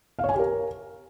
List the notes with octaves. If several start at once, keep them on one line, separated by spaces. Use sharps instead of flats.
F5
C#5
G#5
G4
A#4